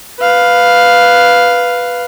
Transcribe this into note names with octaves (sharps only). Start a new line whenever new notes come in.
B4 F5